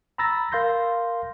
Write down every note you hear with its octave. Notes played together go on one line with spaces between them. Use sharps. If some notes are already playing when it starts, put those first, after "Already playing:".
A#5 B5 E6 A6 A#6
A#4 F5 C6 G6 A#6